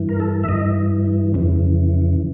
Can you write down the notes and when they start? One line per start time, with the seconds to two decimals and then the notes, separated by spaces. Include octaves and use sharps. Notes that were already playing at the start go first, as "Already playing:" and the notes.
Already playing: G2 E3
0.09 A#4
0.20 A4
0.44 E5
0.48 G2 E3 D#5
1.34 F2 C#3 E3